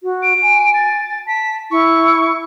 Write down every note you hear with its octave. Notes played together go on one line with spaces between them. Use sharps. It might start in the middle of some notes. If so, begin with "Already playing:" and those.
F#4
D7
G#5
A6
A5 B6
E4 C#6